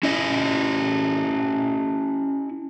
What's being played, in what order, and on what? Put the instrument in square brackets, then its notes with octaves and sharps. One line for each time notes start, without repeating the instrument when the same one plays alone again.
[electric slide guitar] C#4 E4 D#5